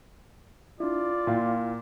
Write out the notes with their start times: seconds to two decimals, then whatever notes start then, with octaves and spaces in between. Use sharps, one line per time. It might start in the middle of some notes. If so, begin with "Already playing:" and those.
0.80 D4 E4 F4 D5
1.27 A#2 E4 F5 G5